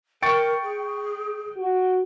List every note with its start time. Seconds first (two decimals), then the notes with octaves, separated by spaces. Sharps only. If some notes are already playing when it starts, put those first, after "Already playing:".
0.22 A#4 G5 C#6 A6 C#7
0.63 G#4
1.57 F#4